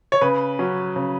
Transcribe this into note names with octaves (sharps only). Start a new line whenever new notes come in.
C#5
C#3 B4
F#3 C#4
C#3